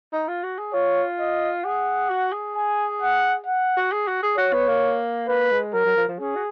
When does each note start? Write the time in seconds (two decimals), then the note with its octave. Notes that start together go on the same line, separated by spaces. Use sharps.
0.13 D#4
0.28 F4
0.44 F#4
0.59 G#4
0.73 F4 C#5
1.19 D#5
1.65 G#4 F#5
2.10 F#4
2.33 G#4
2.55 G#5
3.02 F#5
3.46 F#5
3.77 F#4
3.92 G#4
4.08 F#4
4.23 G#4
4.37 F#4 C#5
4.53 B3
4.68 A#3
5.28 A#3 B4
5.51 G#3
5.74 F#3 A#4
5.86 F#3
5.97 F3
6.08 F3
6.20 C#4 G#4
6.36 F#4